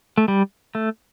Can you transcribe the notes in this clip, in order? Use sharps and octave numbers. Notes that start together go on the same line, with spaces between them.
A3
G3
A3